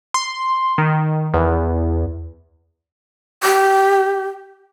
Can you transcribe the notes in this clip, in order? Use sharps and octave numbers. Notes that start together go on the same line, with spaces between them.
C6
D#3
E2
G4